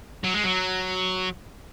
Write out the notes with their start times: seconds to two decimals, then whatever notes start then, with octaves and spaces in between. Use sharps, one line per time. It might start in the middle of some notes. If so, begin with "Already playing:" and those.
0.24 F#3
0.34 G#3
0.43 F#3